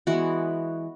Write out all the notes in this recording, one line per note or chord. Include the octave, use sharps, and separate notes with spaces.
E3 G#3 B3 F#4